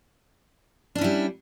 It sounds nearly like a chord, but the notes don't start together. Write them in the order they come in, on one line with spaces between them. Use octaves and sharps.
D4 C#4 E4 G3